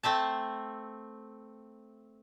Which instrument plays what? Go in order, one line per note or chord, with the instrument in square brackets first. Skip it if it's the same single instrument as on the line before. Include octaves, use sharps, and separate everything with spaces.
[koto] A3 C4 E5 A5